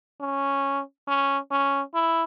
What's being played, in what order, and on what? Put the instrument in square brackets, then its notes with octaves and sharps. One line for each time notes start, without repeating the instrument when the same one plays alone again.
[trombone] C#4
C#4
C#4
E4